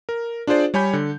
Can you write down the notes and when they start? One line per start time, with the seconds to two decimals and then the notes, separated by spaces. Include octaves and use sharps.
0.09 A#4
0.47 D4 F4 G#4 C5 D5
0.74 G3 C#5 G#5 B5 G6
0.93 D3